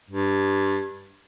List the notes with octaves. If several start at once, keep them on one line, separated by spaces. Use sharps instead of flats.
G2